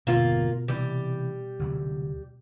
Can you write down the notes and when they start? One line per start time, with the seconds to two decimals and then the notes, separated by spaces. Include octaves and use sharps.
0.07 G1 E2 B2 A#3 F4
0.68 C3 E3 G3 G4
1.59 D2 C3 F#3